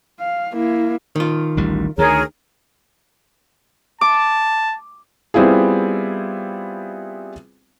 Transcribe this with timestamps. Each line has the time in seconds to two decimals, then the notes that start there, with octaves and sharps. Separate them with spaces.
0.20 F5
0.53 A#3 E4
1.16 D#3 F4
1.57 A1 D2 G3
1.98 D2 D#3 G#4 A#4 C#5
4.01 A5 D6
5.34 G3 B3 C4 E4 F4 G#4